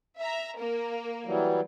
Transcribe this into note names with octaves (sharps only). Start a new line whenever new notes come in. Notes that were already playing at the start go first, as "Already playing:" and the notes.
E5 A#5
A#3 A#4
E3 F#3 G3